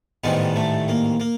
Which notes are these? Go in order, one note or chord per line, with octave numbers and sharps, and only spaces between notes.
A1 G#2 D#3 G3 B3
A3
A#3
A#3